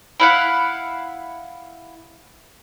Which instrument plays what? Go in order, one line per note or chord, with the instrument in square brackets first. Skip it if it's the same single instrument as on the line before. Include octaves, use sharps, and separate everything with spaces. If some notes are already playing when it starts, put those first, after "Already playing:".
[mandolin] E4 F5 F#5